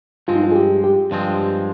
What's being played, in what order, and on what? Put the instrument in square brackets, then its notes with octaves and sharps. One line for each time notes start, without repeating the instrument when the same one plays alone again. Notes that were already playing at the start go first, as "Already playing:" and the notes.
[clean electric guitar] G2 F3 G#3 C4 [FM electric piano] F4
[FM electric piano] D#4
F4
G#4
G4
G4
[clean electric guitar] G2 F3 G#3 C4